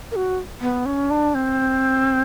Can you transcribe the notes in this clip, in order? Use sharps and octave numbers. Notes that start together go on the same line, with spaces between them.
A#4
F#4
B3
C#4
D4
C4